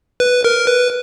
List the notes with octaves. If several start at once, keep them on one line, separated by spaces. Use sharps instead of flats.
B4
A#4
B4